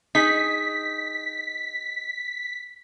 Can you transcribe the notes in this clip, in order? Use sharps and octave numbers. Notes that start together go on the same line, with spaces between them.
D#4 G#4 B6